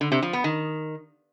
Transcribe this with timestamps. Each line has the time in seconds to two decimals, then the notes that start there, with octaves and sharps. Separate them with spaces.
0.01 D3
0.12 C3
0.23 F3
0.33 B3
0.44 D#3